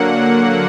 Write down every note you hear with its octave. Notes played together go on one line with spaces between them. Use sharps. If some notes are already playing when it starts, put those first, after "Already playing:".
Already playing: D3 F#3 A#3 F#5